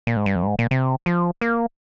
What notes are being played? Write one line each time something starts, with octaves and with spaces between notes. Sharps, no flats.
A#2
G#2
G2
F2
G2
G#2
A#2
C3
F3
A#3